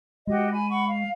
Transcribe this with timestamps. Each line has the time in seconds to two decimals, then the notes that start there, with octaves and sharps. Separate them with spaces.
0.27 G#3 F#4 G4 D#5
0.52 G#5 B5
0.69 F#5 B5 C#6
0.86 F5